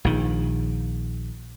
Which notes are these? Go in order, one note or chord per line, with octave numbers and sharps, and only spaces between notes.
A#1 D#3